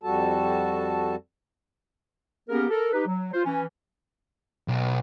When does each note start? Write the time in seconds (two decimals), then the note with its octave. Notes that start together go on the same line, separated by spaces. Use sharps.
0.03 F2 G3 F#4 A4 A5
2.49 A#3 B3 C#4 G4 G#4 A#4
2.70 A4 A#4
2.92 D#4 G4 B4
3.06 F#3
3.33 F4 C5
3.45 E3 C#4
4.68 B1